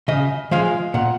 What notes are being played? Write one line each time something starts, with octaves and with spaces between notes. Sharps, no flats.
C#3 D#5
F3 G#3 F5
A#2 F#5